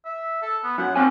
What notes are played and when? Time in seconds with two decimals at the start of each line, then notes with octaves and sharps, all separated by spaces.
0.05 E5
0.42 A4
0.64 B3
0.78 F#2 F#5
0.96 C4 D4 G#5